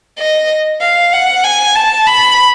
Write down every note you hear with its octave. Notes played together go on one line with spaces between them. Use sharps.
D#5
F5
F#5
G#5
A5
B5